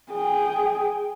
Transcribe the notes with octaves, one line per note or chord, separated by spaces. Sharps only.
G#4 G5